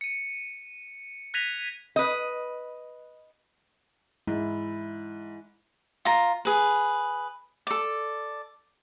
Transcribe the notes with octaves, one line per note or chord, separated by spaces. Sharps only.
C#7 D#7
F#6 G#6 A#6 B6 D#7 F7
B4 D#5
G#2 E4
F4 A#5
G#4 B4
A4 D5